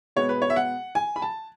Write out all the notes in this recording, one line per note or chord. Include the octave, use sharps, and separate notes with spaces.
B2 G#3 B3 C#5
B4
C#5
E5
F#5
G#5
B5
A5